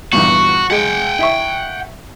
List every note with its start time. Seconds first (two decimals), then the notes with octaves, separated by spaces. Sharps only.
0.13 E2 G2 A#2 F#4
0.71 G#3 F#5 G5
1.19 E4 E5 C#6